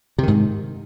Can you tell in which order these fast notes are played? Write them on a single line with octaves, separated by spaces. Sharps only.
C3 D#3 G#2